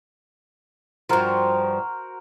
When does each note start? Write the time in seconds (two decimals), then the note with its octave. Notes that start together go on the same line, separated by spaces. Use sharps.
1.09 G2 F3 F#4 A#4 C5